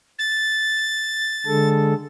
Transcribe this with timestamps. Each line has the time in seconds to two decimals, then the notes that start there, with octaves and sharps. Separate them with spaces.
0.19 A6
1.46 D3 G#3 A4